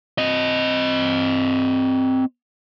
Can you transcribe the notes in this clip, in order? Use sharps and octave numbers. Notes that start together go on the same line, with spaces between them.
C4 D#5